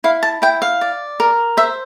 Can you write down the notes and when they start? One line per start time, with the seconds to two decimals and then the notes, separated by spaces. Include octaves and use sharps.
0.04 E4 F5
0.23 A5
0.42 E4 G5
0.62 F5
0.81 D5
1.20 A#4
1.57 C5 E5